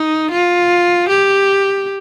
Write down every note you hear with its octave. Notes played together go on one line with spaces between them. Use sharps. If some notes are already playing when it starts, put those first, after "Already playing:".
Already playing: D#4
F4
G4